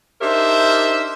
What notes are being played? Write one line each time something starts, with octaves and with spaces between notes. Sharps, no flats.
D4 D#4 G4 A#4 C5 E5